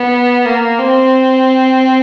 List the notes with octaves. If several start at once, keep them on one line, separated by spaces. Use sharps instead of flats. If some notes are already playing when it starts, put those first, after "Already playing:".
Already playing: B3
A#3
C4